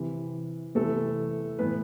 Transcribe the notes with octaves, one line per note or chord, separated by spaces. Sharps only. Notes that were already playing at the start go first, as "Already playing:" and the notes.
Already playing: C3 E3
C3 E3 A3 A4
A2 E3 B3 B4